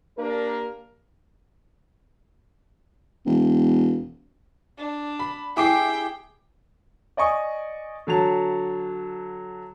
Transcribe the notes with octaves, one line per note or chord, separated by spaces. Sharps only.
A#3 D4 G4 A#4
E1
D4
B5
E4 G4 G#4 G5 D6 C7
D5 D#5 G#5 C#6 D#6
D3 F#3 A5 F7